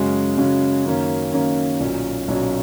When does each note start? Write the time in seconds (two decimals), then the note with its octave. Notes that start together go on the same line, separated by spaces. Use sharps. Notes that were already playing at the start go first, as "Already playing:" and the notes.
Already playing: F#2 C#3 G#3 C#4 F#4
0.37 F#2 C#3 G#3 C#4 F#4
0.85 F#2 D#3 A#3 C#4
1.33 F#2 D#3 A#3 C#4
1.80 B1 A#2 F#3 C#4
2.28 B1 A#2 F#3 C#4